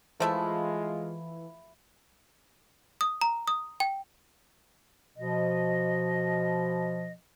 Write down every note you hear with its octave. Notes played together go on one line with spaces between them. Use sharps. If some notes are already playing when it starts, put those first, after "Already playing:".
E3 F3 G#3 A3 E4 F4
D#6
A#5
D#6
G5
B2 F3 D#5